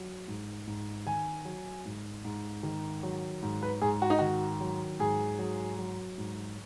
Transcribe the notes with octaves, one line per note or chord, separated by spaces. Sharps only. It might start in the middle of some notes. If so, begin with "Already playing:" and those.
Already playing: F#3
G#2
G#2
D#3 G#5
F#3
G#2
G#2
D#3
F#3
G#2
B4
G#2 G#4
F#4
D#4
D#3 F#4
F#3
G#2 G#4
F#3
F#3
G#2